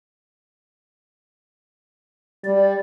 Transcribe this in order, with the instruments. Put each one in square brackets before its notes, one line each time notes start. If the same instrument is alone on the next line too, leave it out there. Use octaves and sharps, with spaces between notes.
[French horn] G3 [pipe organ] D5